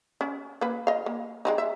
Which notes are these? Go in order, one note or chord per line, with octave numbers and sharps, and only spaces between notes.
C#4
A#3 B4
D#5 F5
A#3
G#3 C4 D#4
E5